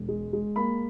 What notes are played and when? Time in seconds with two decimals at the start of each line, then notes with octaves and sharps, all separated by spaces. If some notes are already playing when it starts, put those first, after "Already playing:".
Already playing: E1
0.08 G#3
0.33 G#3
0.56 A#3 B5